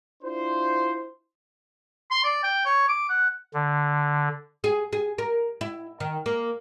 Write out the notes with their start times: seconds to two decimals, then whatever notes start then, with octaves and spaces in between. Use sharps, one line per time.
0.23 D4 E4 F4 C5
2.11 C6
2.24 D5
2.43 G5
2.65 C#5
2.88 D6
3.09 F#5
3.54 D3
4.64 G#4
4.93 G#4
5.18 A#4
5.61 E4
6.00 D#3
6.26 A#3